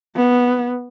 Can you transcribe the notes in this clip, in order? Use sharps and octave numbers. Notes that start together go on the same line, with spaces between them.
B3